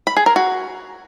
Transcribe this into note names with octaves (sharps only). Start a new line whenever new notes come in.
B5
G#4
A#4
F#4